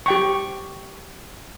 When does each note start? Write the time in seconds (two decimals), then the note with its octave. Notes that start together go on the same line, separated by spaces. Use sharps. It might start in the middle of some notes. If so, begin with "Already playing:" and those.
0.06 G4 G5 C#6